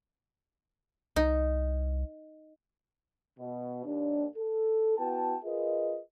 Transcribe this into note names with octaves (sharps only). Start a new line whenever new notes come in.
C2 D#4
B2
D#2 D4
A4
B3 E4 F#4 B4 G5 A5
F4 G#4 A#4 B4 D#5